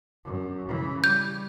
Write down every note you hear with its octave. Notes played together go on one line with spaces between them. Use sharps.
F#2
C#3 E3
G3 G6